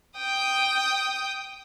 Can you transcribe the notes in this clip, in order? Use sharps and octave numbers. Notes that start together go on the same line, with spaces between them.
G5 D#6